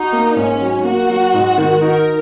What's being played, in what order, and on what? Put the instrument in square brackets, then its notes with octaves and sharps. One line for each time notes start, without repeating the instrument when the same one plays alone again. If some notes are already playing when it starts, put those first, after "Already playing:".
Already playing: [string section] D#4 [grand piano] F#4
[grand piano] A#3
[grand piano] G#2 [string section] C#4
[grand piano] F#3
[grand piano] A#3 [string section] F#4
[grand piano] F#3
G#2
D#3
[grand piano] D#4 [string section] A#4